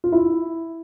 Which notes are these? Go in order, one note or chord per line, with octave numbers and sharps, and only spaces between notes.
F4
E4